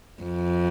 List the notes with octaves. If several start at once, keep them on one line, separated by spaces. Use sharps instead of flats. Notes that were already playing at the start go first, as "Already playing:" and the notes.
F2